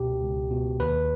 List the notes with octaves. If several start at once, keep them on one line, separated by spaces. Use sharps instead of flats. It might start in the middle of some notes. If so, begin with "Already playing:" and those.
Already playing: C#2 B2 G4
C#2
B2
D#2 B4